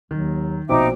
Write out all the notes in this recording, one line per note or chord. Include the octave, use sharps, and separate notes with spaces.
D#2 D#3 F#3
A#1 B2 C4 D#4 E5 D6